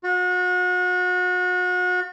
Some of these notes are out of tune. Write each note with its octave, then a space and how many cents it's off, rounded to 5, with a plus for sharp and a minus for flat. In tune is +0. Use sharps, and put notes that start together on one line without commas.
F#4 -35